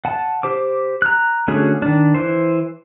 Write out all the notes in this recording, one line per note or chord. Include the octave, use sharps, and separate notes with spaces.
F#5 A5
G4 C5 D6
A#5 F#6
D3 A3 C#4 F#4 G#4
D#3 D4
E3 C5